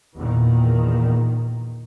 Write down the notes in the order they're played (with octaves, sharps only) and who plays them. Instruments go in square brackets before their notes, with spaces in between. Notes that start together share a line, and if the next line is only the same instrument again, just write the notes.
[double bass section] E2 A#2 D#3